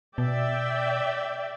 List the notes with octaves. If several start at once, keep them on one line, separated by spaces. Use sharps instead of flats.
B2 D5 E5 G5